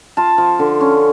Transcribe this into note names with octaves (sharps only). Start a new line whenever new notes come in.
F4 A5
F3
D3
C#4